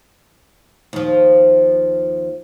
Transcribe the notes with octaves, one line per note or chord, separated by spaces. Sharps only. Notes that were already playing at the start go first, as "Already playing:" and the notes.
D#2 F3